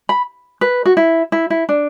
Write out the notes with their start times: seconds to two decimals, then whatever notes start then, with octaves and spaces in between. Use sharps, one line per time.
0.09 B5
0.61 B4
0.86 F#4
0.97 E4
1.32 E4
1.50 E4
1.69 D4